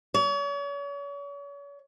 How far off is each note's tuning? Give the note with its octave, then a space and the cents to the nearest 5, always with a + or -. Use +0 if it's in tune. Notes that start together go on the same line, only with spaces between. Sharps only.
C#5 +40